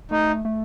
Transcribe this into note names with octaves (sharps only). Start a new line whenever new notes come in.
A3 D#4
A3